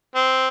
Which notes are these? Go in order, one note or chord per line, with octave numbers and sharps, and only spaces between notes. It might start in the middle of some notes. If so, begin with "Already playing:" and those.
C4